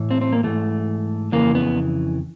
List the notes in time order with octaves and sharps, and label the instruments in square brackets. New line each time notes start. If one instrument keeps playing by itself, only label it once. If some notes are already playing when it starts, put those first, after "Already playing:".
Already playing: [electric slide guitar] A2 E3
C4
C4
A#3
G#2 E3 A3
F2 C#3 E3 A#3
B3